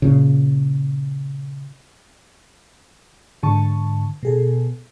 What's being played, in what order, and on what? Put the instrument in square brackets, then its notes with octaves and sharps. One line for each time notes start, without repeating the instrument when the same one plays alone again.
[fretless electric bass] A#2 C#3
[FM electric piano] G#2 D3 A5 C#6
B2 G#4 A4